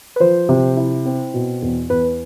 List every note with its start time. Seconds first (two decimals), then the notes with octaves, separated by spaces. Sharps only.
0.16 B4
0.20 F3 C5
0.49 C3
0.77 E4
1.05 C4
1.34 B2
1.62 E2
1.89 E2 B4